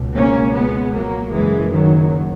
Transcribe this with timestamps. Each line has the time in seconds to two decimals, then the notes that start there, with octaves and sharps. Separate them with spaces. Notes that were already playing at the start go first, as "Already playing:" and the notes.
Already playing: C#2 B2
0.14 A#3 C#4
0.53 G#3 B3
0.92 F#3 A#3
1.31 F#1 F#2 C#3 E3 G#3
1.71 D#3 F#3